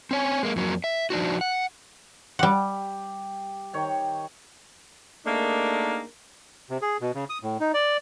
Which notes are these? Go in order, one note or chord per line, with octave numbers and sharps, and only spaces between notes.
C4 C#5 G#5
G#3 A#3
F2 F#3 A#3
E5
F3 D4 D#4 F#4
F#5
G3 G4 F#5
D#3 C#5 G5
A3 A#3 D4 D#4 G#4 A#4
C3
G#4
B2
C#3
D#6
A2
D#4
D5